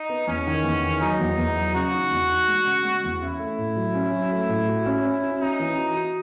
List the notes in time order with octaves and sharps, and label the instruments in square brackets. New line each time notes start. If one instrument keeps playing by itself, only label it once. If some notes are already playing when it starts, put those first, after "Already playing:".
Already playing: [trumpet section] D#4
[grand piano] B3
[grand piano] E2 [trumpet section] C#4
[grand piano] D#3
E2
D#3
[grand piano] F#3 [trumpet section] D#4
[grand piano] E2
E2
F#3
[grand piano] C#3 [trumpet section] F#4
[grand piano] D#4
E2
D#4
G#3
C#3
G#3
E2
[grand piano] C#4 [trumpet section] E4
[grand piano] A3
A2
F#3
C#4
F#3
A3
A2
F#4
C#4
C#4
F#4
[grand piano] C#4 [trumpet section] D#4
[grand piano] E3
F#4
F#4